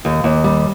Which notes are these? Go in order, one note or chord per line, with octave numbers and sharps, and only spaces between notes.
D#2
D#2
G3